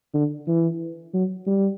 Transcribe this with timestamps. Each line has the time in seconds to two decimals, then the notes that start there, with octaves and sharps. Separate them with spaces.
0.14 D3
0.47 E3
1.14 F#3
1.47 G3